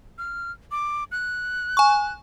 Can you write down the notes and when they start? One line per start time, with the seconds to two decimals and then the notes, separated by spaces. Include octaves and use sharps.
0.18 F6
0.71 D6
1.12 F#6
1.77 G#5 C#6